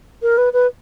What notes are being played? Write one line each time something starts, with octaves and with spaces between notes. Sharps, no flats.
A#4
B4
B4